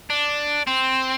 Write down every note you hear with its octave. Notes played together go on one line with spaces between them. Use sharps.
D4
C4